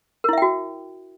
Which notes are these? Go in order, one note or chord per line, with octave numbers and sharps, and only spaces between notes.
E4 F#4 A#4 E5 G5